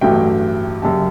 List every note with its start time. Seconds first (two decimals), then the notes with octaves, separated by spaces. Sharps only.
0.01 A1 G2 F#3 A3 G5
0.82 F#2 C#3 G3 A5